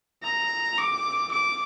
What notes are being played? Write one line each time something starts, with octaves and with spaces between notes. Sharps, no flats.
A#5
D6
D6